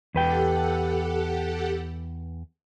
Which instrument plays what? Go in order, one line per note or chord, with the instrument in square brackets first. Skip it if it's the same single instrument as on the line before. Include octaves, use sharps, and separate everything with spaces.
[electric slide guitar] E2 B4 G5 [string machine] G4 A4 F#5